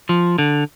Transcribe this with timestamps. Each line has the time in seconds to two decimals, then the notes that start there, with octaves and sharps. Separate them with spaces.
0.09 F3
0.38 D3